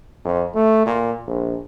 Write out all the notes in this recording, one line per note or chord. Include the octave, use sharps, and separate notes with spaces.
F2
A3
A#2
A#1